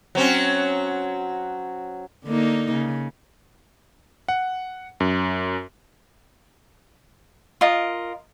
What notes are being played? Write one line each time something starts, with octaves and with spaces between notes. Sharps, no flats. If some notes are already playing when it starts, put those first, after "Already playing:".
F#3 C4 C#4
D3 A#3 D#4
C#3
F#5
F#2
F4 A#4 D#5